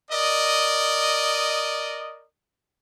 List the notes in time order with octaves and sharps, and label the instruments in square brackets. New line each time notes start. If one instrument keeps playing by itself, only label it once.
[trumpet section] A#4 D5 D#5